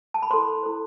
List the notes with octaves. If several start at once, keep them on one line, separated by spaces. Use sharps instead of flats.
A5
B5
E4 A4 C5 C6
E4 A4 C5